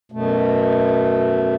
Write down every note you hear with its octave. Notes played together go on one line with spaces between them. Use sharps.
F#2 B2 A3